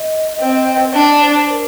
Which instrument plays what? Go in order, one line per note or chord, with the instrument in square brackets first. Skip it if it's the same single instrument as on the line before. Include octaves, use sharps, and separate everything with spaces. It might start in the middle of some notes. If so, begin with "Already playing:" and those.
Already playing: [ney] D#5
[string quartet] C4
[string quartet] D4 [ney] D5
[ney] C5
A#4